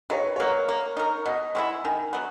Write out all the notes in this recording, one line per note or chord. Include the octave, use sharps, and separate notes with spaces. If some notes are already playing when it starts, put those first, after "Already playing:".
D#3 C#5
B4
F#3 A#3 C#5
A#3
D#4 A#4
B2 D#5
G#3 C#4 E4 F#5
D#3 G#5
F#3 B3